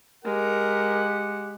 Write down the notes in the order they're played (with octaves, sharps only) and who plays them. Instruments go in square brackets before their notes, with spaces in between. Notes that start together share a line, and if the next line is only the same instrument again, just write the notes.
[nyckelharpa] G#3 [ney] G4 [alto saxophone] A#4 [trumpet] F#5